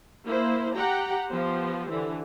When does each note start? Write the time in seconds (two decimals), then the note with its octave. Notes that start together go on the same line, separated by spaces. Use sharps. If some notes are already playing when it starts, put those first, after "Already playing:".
0.25 A#3 E4 C5
0.74 G4 F#5 G5 A#5
1.28 F3 B3 G4 C5
1.90 D3 E3